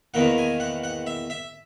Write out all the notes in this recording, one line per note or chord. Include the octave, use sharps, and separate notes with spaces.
E2 D#3 A#3 F#5
G#5
F#5
F#5
E5
E5